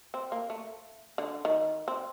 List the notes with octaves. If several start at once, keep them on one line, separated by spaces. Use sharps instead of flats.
C4
A#3
A3
D3
D#3
C4